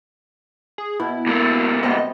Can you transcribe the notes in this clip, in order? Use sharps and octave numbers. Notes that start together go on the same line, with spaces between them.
G#4
B2 E4
C#2 A#3
C3 G3 B3 D#5